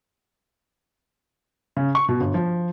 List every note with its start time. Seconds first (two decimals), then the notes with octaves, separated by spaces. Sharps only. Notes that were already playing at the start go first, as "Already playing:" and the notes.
1.77 C#3
1.95 C#6
2.09 B2
2.21 G1
2.34 F3